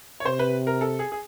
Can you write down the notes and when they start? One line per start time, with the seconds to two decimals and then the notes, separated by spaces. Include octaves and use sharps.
0.20 C#5
0.25 C3 C5
0.39 B4
0.67 A#4
0.81 A4
0.99 G#4
1.12 G#4